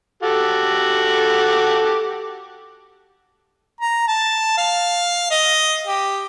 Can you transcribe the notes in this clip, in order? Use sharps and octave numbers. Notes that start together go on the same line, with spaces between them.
F#4 G4 A4
A#5
A5
F5
D#5
G4